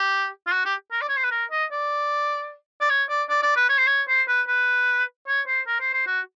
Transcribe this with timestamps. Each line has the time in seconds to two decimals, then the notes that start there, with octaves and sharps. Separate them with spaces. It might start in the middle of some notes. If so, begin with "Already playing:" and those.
Already playing: G4
0.47 F4
0.52 F#4
0.65 G4
0.92 A#4
1.01 D5
1.09 C#5
1.17 C5
1.24 B4
1.31 A#4
1.51 D#5
1.71 D5
2.81 D5
2.90 C#5
3.09 D5
3.29 D5
3.42 D5
3.56 B4
3.69 C#5
3.78 C5
3.87 C#5
4.08 C5
4.28 B4
4.48 B4
5.27 C#5
5.47 C5
5.67 A#4
5.80 C5
5.94 C5
6.07 F#4